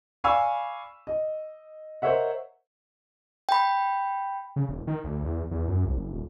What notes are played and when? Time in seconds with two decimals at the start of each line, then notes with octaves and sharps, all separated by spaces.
0.24 D5 F5 G#5 B5 C#6 E6
1.07 D#5
2.02 A#4 C5 C#5 D#5 E5 F#5
3.49 G5 B5
4.56 C#3
4.69 E1
4.87 D#3
5.04 D2
5.24 E2
5.51 E2
5.68 F#2
5.85 C2
5.97 F#1
6.12 D#1